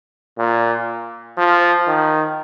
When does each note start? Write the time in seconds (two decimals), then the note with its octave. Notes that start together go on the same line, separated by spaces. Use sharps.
0.38 A#2
1.38 F3
1.88 D#3